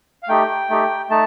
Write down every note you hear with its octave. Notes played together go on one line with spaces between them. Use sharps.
F5
A3 D#4 G4 G5
A3 D#4 G4
A3 D#4 A5